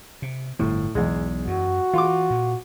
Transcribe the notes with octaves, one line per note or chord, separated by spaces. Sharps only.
C3
G1 A2 F3
B1 E2 G#3
F#2 F#4
E3 F4 C6 D6
A#2